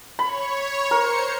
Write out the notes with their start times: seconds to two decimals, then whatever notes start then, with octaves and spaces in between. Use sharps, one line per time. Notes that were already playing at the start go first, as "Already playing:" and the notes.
0.19 C#5 B5
0.91 A#4 C5 C#7